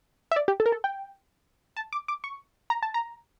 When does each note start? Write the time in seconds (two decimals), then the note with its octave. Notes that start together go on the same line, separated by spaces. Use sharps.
0.31 E5
0.36 D5
0.48 G4
0.60 A4
0.66 A#4
0.72 A4
0.84 G5
1.77 A5
1.93 D6
2.08 D6
2.24 C#6
2.70 A#5
2.83 A5
2.94 A#5